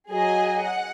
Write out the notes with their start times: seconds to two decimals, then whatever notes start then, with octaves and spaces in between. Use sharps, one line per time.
0.11 F#3 G#4 D#5 G#5
0.63 F#5